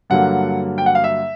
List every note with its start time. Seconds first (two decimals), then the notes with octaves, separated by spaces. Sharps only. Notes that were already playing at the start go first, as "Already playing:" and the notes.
0.10 G2 D3 F#3 A#3 F#5
0.78 G5
0.86 F#5
0.95 F5
1.04 E5